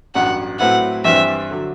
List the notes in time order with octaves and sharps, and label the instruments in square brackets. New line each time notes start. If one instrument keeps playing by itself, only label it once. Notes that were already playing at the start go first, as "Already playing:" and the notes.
[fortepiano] A1 G2 F#3 [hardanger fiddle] F#5
[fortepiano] A2 F#3 C4 E4 B4 [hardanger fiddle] F#5
[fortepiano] G2 E3 G3 C4 [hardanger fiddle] E5
[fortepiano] D3 F#3